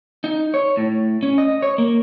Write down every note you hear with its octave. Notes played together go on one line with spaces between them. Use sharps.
D#4
C#5
A2
C#4
D#5
C#5
A#3